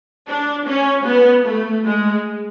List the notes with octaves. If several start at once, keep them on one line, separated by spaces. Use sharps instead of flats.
D4
C#4
B3
A3
G#3